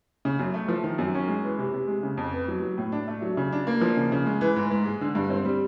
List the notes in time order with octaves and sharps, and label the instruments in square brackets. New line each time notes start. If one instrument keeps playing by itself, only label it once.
[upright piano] C#3
F#2
A3
F3
D#3
F#2
C#4
G#3
E3
C3
C3
G#3
C#3
F2
B3
F#3
F#3
A2
D4
A3
F#3
C#3
D4
A#3
F3
C#3
C#3
G#3
E3
G#2
G#2
G#3
D3
G2
C4
G3